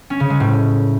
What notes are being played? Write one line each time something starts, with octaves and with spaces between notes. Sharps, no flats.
C#4
C#3
G#3
A2